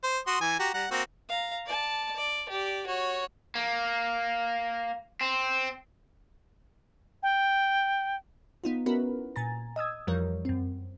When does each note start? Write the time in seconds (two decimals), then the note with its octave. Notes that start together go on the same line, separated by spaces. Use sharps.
0.03 C5
0.27 F#4 C6 D#6
0.41 E3 G#5
0.59 F#4 G4 A#5
0.74 G3 F#5 A#5
0.91 A#3 C4 F#4
1.29 F5 A#5
1.66 D5 A5
2.16 D5
2.49 G4 D5
2.86 F#4 C#5
3.55 A#3
5.21 C4
7.23 G5
8.64 B3 D#4 F4
8.86 B3 C#4 E4 F#4 A#4 B4
9.36 A#2 G#5 A#5 A6
9.76 D#5 D#6 E6 G#6
10.07 F2 E3 F3 G3 A#4 C#5
10.45 F#2 C4